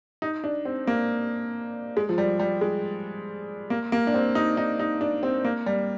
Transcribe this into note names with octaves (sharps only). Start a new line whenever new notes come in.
D#4
D4
C4
A#3
G#3
F3
G3
G3
G#3
A#3
A#3
D4
C4
D#4
D#4
D#4
D4
C4
A#3
G3